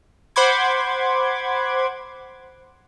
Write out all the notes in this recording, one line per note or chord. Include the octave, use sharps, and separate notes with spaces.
C5 F#5 B5 C6 D6 G#6